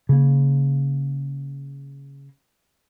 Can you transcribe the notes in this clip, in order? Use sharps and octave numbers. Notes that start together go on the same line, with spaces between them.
C#3 A#3